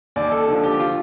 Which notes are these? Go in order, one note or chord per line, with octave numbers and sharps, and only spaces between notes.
D#2 D5
A4
D3 F3
G4
F4